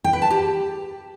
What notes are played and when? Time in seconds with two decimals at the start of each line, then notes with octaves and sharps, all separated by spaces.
0.04 G5
0.13 B4
0.22 A5
0.30 G4